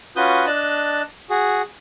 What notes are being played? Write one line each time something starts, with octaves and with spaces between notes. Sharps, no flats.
C#4 F4 F#4 B4 D#6 G6
D4 D#5 A5 F#6
F#4 G#4